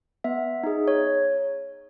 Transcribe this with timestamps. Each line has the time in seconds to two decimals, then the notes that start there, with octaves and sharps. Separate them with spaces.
0.24 B3 E5
0.63 D#4 G#4
0.88 C#5